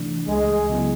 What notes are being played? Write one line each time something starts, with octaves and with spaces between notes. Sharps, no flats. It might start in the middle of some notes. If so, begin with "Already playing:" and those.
Already playing: C3 E3 A3 D4
C#2 G#3
C#3 F#3 B3 E4